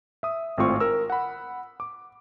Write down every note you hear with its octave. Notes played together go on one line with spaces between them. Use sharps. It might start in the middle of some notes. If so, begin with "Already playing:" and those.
E5 D#6
G#1 A2 C4 F4 C#6
A#4 E6
F#5 B5
D6